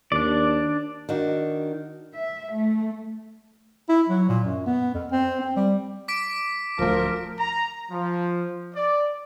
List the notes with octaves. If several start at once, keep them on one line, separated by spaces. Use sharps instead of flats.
D#2 D4 D5
D#3 D4 F#4
E5
A3
E4
F#3
A#2
F#2
B3
F2
C4
C4
G3
D6 B6 D7
D1 D2 F3 A3 A#4
A#5
F3
D5